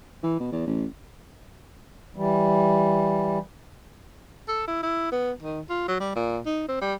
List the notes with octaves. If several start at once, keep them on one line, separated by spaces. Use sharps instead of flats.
E3
B2
E2
A1
E3 G3
A4
E4
E4
B3
D#3
F4
F#3
G3
A#2
D#4
C4
G3